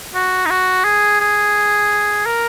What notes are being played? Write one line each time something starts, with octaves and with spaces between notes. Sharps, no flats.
F#4
D#4
F#4
G#4
G#4
A#4